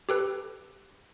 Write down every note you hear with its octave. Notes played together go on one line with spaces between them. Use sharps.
G4 A4 B4